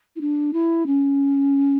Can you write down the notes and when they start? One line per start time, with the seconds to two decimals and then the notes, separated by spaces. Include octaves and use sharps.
0.16 E4
0.21 D4
0.53 E4
0.87 C#4